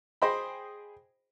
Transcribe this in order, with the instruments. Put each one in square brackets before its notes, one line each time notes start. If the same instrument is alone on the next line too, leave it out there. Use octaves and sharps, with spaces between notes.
[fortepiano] G#4 C5 D#5 G5 B5